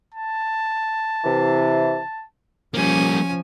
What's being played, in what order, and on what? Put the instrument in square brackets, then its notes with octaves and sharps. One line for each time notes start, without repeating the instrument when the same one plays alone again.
[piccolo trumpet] A5
[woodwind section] C3 E3
[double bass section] F3 [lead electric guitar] G3 A#3 [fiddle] C#4 G#5